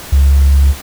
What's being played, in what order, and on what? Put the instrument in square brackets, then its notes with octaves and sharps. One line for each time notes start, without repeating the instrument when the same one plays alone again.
[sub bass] C#2